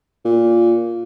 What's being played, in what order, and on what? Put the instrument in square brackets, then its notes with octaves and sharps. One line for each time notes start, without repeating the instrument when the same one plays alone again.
[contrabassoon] A#2